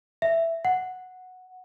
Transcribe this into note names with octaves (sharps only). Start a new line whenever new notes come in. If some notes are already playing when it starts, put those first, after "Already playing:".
E5
F#5